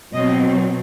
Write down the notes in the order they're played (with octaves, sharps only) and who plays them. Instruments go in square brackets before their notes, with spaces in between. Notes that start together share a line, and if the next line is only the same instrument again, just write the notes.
[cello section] B2 F#3 C4 D#5